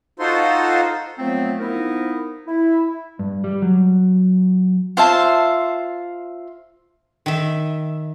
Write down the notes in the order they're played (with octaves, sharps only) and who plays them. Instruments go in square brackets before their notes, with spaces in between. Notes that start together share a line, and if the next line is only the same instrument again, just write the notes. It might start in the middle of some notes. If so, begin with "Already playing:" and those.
[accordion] D#4 F4 F#4 A4 C5 C6
[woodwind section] F3 F#3 A3 B3 C4
F3 B3 D#4 E4 A#4
E4
[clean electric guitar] G2
G3
F#3
[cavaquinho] F4 C5 E5 A5
[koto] D#3 E5